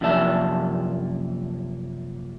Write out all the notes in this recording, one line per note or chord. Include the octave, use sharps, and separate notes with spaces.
F#2 C3 F3 A#3 E5 A5